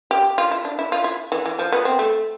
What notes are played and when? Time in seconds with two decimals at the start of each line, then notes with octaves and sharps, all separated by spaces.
0.11 G4
0.38 F4
0.51 E4
0.65 D4
0.79 E4
0.92 F4
1.04 E4
1.32 E3
1.46 E3
1.59 F3
1.72 B3
1.85 C4
1.99 A3